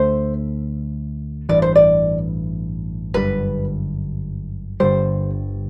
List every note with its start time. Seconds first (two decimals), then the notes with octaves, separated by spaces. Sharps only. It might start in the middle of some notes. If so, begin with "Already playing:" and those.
Already playing: D2 D3 A3 C5
1.49 A1 G2 E3 D5
1.62 C5
1.76 D5
3.14 G1 F#2 D3 G3 B4
4.80 G1 G2 D3 G3 C5